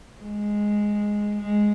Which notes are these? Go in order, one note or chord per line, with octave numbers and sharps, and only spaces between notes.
G#3
G#3